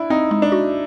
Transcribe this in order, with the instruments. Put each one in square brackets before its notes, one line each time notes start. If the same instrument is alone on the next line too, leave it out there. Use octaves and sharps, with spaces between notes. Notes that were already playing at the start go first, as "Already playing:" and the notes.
Already playing: [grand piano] D4 E4
[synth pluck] C4 [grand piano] D#4
[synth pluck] G#3
[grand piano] D4
[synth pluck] F#4